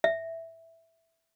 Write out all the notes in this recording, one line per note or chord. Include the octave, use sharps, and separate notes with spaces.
E5